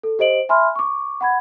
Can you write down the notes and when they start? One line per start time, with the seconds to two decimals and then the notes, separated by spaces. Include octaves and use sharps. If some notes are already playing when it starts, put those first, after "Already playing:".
0.03 A4
0.19 G4 C5 D#5 D7 F#7
0.49 E5 G#5 B5 C6 F6
0.76 C#6 D6
1.21 F#5 B5 G#6